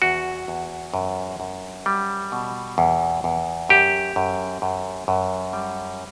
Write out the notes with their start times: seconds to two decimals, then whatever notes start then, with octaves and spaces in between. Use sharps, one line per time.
0.02 E2 F#4
0.48 E2
0.94 F#2
1.40 F#2
1.86 G3
2.32 B2
2.78 E2
3.24 E2
3.69 F#2 G4
4.16 F#2
4.62 F#2
5.08 F#2
5.53 G3